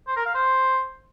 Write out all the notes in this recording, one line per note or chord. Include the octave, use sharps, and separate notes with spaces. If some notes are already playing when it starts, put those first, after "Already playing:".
C5
A#4
F5
C5